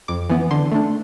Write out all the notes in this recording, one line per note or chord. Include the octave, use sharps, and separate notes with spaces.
F2 D6
E3 B3
D3 C6
A3 D4